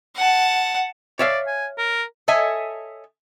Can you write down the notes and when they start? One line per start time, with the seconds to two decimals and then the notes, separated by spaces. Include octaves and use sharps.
0.16 F#5 A5
1.19 C#5 D5 E5 F5
1.47 G#5
1.78 A#4
2.28 A4 C#5 D#5 E5 G#5